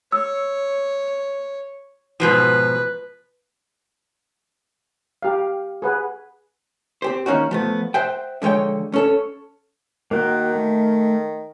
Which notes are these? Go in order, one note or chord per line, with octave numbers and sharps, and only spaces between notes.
C#5 E6
G#2 B2 F3 B4
G4 F5
G#4 B4 F#5
C4 G4 C5
D#3 A#3 C#4 D#4 F#4
F3 A3 B3
C5 E5 F#5 G5
D3 F3 G#3 C#5 G5
C#4 A4 C#5
D#3 A#3 F#4 G5
A3